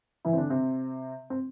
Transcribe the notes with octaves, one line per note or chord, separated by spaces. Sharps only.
E3 E4
C4
D3 D4
C3 C4
C4